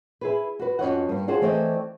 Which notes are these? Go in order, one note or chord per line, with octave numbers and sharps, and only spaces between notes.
E4 G#4 B4
F#4 B4
F2 E3 C#4 F#4 D#5 F#5
G2 A#3
D4 F4 F#4 G#4 C5 C#5
E3 A3 C4 D5 D#5